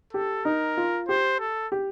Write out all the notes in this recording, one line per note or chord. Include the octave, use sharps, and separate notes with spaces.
G4 A4
D#4 A#4
F4
G4 C5
A4
G4